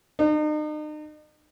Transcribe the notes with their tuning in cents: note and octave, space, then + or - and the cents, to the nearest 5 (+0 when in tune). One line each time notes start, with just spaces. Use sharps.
D#4 -40